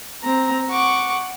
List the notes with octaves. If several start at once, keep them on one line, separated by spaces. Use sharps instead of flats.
C4 A#5
F#5 C#6 D6